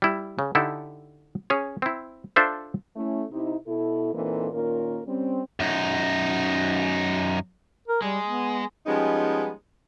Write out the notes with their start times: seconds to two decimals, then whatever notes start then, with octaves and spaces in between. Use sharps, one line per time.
0.02 G3 E4
0.39 C#3
0.55 D3 D#4 E4 G4 A4
1.50 C#4 G#4 C#5
1.82 C4 E4
2.36 D4 F4 A4 C5 D5 E5
2.96 A3 C#4 E4
3.31 C3 D#4 E4
3.66 B2 E4 A4
4.14 A#2 E3 A#3 C4 D#4 A4
4.53 A#2 D#3 A#3 C#4 F4 A#4
5.07 G3 C4 C#4
5.60 F#2 D#4
7.88 A#4
8.02 G3 G#3
8.24 B3
8.86 F3 G3 G#3 B3 C#4 D#4